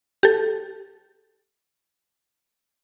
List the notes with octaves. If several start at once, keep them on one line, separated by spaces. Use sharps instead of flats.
G4 A4